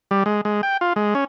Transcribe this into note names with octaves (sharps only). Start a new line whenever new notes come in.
G3
G#3
G#3
G5
F4
G#3
C#4